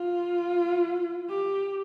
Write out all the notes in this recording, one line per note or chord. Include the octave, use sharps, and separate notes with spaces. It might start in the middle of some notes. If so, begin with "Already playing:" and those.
Already playing: F4
G4